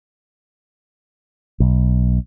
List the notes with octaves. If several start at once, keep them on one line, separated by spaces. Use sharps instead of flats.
B1